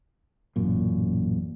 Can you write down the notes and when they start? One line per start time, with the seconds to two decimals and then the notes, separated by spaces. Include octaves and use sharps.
0.56 A1 F#2 A#2